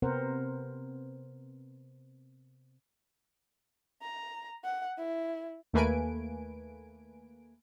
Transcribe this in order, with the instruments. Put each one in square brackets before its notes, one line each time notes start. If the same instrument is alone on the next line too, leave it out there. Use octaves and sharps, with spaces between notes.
[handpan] C3 B3 C4 A#4 C5 F#5
[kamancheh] A#5
F#5
E4
[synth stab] D#2 A3 A#3 B4 G#5 D7